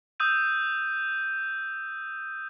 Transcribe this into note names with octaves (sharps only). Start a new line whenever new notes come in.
D#6 E6 G6 D#7